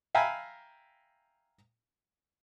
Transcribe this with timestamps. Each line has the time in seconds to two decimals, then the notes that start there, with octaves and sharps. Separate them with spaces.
0.15 E5 F5 G5 G#5 A#5 B5